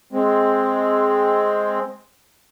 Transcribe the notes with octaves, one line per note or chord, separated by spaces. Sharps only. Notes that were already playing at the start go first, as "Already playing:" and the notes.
G#3 C4